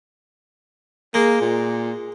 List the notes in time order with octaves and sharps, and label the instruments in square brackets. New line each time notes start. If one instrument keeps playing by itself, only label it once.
[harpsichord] G#3 [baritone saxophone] A#3
[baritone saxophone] A#2